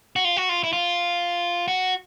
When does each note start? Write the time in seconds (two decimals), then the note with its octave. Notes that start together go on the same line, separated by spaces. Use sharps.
0.16 F#4
0.25 F4
0.37 F#4
0.49 F4
0.64 E4
0.73 F4
1.68 F#4